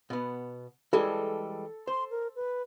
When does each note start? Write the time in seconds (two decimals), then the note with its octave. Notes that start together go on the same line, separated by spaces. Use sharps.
0.10 B2 B3
0.93 E3 G3 G#3 A4
1.88 C5 C6
2.11 A#4
2.36 B4